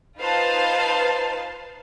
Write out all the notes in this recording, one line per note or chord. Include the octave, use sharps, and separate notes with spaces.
D#4 F4 B4 C5 F5 A5